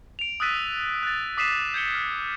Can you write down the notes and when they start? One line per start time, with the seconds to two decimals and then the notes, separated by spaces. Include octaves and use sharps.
0.19 D7 F7
0.40 D#6 E6 F#6 A6 B6 D#7
1.03 F#6 A6
1.37 D6 D#6 B6 C7 D#7 E7
1.74 G6 G#6 C#7 G7
1.95 F6